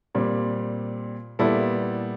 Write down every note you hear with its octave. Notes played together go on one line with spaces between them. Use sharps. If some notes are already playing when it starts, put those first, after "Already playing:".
A#2 G3 C4
A#2 G3 B3 E4 A4